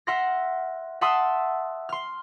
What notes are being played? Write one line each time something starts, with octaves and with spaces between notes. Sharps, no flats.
E5 F#5 C6 F6 F#6 A#6
E5 F#5 A5 C6 D#6 E6
C6 F6